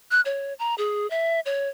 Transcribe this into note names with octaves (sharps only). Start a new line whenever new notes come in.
F#6
C#5
A#5
G#4
E5
C#5